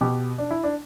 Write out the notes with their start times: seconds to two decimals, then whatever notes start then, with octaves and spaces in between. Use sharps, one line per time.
0.01 B2 G4
0.38 D4
0.51 E4
0.64 D4